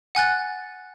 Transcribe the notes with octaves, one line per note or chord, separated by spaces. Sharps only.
F#5 G#5 F#6 A6